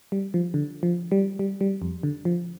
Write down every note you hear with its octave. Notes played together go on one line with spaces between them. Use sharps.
G3
F3
D3
F3
G3
G3
G3
F2
D3
F3